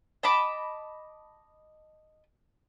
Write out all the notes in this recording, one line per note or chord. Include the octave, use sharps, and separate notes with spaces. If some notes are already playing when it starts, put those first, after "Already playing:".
D#5 A5 B5 D6